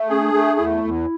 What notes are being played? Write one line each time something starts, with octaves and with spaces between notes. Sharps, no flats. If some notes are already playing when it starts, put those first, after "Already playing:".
Already playing: A3
C#4 G#4
D4
A3
E2 E4
E2